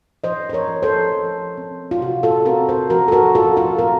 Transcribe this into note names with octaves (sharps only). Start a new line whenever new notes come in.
F3 C5 D#5
C5
A#4 C#5
F3
A4 C5
F3
C4
F4
C3 F#4
F4 A4
C4 F#4 A#4
A4 C5
F3 F#4 A#4
A4
F#4 A#4
F3 F4 A4
F4 A4
C4 F#4 A#4